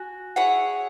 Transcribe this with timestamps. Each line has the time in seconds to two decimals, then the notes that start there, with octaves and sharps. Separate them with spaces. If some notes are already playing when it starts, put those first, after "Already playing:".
Already playing: F#4 G#5
0.36 E4 G#4 C#5 F#5